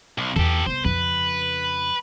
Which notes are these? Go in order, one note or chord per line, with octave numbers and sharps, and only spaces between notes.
B1
E2 G4 A4
C2 B3 C5
F2 C#3 B4